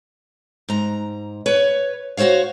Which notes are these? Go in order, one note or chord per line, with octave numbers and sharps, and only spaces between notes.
G#2 A#5
B4 C#5
F#4 G#4 C5 C#5 F5